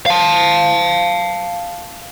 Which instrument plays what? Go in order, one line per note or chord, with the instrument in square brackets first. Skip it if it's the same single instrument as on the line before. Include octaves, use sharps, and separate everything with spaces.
[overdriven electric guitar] F5 A5